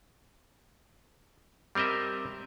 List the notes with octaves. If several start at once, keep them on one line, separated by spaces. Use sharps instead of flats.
G3 C4 A#4 D#5 E5